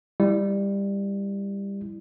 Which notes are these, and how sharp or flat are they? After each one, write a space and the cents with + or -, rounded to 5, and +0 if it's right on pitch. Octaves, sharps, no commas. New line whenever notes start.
G3 +20 E4 +0